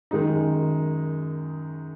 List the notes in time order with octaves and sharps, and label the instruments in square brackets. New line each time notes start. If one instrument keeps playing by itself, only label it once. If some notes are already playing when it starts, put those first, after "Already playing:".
[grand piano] F#2 D#3 G#3 D#4